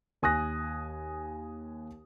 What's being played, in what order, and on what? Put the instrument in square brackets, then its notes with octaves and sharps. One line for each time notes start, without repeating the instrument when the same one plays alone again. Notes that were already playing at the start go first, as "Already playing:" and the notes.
[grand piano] D#2 G#5 D#6 F#6 A#6